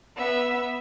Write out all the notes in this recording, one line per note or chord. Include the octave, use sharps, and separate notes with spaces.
B3 E5